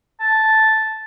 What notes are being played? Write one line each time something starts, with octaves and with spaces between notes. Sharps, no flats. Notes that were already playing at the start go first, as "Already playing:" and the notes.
A5